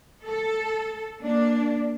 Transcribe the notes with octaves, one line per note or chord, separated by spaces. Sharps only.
A4
A#3 D4